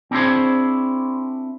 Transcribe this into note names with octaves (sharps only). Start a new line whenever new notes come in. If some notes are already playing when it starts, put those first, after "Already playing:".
C4 D4 E4 G#4 C5 C#5